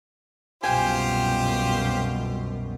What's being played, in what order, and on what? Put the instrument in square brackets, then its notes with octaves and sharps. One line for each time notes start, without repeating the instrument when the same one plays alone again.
[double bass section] C2 F#2 B2 [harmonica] F4 G4 C5 [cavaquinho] G5 G#5